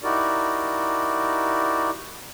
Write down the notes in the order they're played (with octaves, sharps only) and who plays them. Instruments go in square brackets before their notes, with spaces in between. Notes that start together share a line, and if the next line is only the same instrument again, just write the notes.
[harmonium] D#4 E4 F#4 G4 A#4 D5